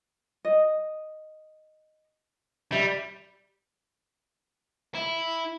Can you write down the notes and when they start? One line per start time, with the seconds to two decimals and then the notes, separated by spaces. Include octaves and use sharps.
0.45 D#5
2.72 G3 E5
4.95 E4